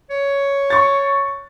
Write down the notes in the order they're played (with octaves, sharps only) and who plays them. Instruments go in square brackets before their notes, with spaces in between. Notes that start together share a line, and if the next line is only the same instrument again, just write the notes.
[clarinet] C#5
[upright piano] C#6 A6